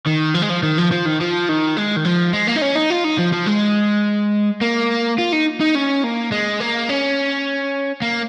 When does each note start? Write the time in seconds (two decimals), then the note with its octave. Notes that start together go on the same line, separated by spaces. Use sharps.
0.06 D#3
0.34 F3
0.42 G#3
0.50 F3
0.63 D#3
0.78 F3
0.91 F3
1.06 D#3
1.20 F3
1.49 D#3
1.77 G#3
1.96 D#3
2.05 F3
2.33 G#3
2.47 A#3
2.56 D#4
2.62 C#4
2.76 D#4
2.90 F4
3.05 D#4
3.19 F3
3.33 F3
3.47 G#3
4.62 A#3
5.18 F4
5.33 D#4
5.61 D#4
5.75 C#4
6.04 A#3
6.31 G#3
6.60 A#3
6.89 C#4
8.02 A#3